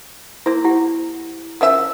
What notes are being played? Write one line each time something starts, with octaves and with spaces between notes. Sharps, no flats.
A#3 E4 C5
E4 G4 F#5
C#3 F3 A#4 E5 F#5